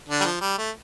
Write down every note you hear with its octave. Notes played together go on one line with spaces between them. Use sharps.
D3 D4
G3
F3
G3
A3